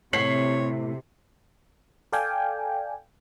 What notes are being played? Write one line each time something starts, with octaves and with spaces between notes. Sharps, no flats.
A2 C3 C#5 B6 C7 F#7
A4 D5 F5 G5 G#5